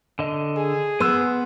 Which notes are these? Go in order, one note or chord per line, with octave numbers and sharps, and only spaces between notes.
D3 D#5
G#4
B3 B4 C6 E6